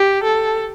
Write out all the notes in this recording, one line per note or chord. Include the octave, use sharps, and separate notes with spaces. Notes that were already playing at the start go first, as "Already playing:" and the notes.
Already playing: G4
A4